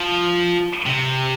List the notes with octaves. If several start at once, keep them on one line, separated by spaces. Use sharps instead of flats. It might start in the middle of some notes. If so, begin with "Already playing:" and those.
Already playing: F3
C3